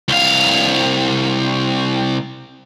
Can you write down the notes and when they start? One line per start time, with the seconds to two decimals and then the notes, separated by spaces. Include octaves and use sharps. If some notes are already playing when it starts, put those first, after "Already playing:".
0.08 C2 F5